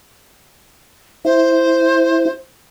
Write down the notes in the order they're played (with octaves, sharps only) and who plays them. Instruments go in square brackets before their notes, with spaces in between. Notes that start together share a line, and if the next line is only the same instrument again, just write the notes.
[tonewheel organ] E4 [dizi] C5